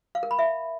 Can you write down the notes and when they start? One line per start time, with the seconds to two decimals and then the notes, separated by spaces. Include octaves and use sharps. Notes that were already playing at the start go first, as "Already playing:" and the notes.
0.15 F5
0.23 A#4
0.31 B5
0.39 E5